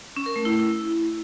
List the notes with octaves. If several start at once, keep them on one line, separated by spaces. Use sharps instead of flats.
C#4
A#4
A3
E4